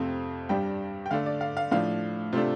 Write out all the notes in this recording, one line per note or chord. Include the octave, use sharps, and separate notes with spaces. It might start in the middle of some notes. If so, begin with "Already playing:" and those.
Already playing: F2 C3 A3 C4 F5
G2 G3 D4 G5
G5
D3 A3 D4 F5
D5
F5
F5
A2 F3 D4 F5
C3 A3 D4 F4